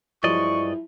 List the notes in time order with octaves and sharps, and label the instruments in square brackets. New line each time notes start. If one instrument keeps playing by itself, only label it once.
[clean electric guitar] G2 D5 D#5 [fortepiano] F3 F#3 G#3 [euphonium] E4 [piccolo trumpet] C#6